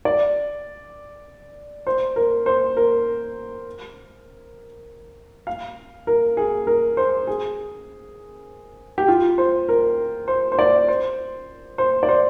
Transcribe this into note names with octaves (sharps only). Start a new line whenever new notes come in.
D5
C5
A#4
C5
A#4
F5
A#4
G#4
A#4
C5
G#4
G4
F4
C5
A#4
C5
C5
D5
C5
C5
D5
C5